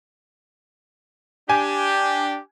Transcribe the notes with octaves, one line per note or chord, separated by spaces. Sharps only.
D4 G4 G#5